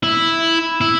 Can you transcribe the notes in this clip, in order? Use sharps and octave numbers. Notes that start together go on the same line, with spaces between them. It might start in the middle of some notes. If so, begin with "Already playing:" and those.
E4
E4